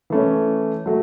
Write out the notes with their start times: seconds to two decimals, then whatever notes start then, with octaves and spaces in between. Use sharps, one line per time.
0.10 E3 A3 C#4
0.86 F#3 A3